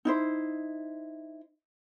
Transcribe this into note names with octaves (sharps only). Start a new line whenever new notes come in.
D#4 E4 C5